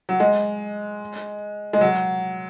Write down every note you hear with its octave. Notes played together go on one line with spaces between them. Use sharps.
F#3
G#3
G#3
F#3